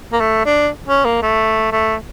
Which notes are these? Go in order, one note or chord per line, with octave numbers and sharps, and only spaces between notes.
A#3
A3
D4
C#4
A#3
A3
A3